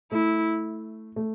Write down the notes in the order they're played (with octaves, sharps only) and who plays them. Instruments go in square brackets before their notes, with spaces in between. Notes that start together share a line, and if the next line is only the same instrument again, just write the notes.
[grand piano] A3 [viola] E4
[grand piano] A3